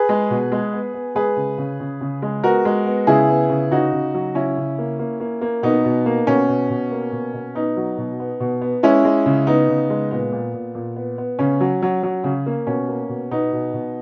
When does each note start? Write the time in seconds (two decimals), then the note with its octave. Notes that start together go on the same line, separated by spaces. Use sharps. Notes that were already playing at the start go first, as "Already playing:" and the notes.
Already playing: G#4 B4
0.09 G#3
0.30 B2
0.52 G#3
0.73 B3
0.94 B3
1.15 G#3 G#4 B4
1.37 C#3
1.58 C#3
1.80 C#3
2.01 C#3
2.22 G#3
2.43 B3 F#4 A#4
2.65 G#3
2.86 B3
3.07 C#3 E4 G#4
3.29 B3
3.50 C#3
3.71 C#3 D#4 F#4
3.92 C#3
4.14 F#3
4.35 C#3 C#4 E4
4.57 C#3
4.79 A#3
4.99 A#3
5.20 A#3
5.41 A#3
5.63 B2 B3 D#4
5.85 B2
6.06 A#3
6.27 B2 C#4
6.48 B2
6.70 B2
6.91 A#3
7.12 B2
7.34 B2
7.55 B3 D#4
7.77 F#3
7.98 B2
8.20 B3
8.40 B2
8.61 B3
8.83 G#3 C#4 E4
9.05 G#3
9.26 C#3
9.47 B3 D#4
9.69 C#3
9.90 G#3
10.11 A#2 B3
10.32 A#2
10.54 A#2
10.75 A#2
10.96 B3
11.18 B3
11.39 C#3 C#4
11.60 F#3
11.82 F#3
12.03 F#3
12.24 C#3
12.46 A#3
12.67 B2 C#4
12.88 A#3
13.09 B2
13.31 B2 B3 D#4
13.52 B2
13.74 B2